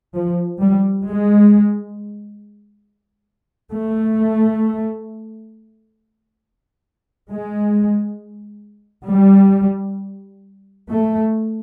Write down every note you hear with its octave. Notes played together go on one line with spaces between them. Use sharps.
F3
G3
G#3
A3
G#3
G3
A3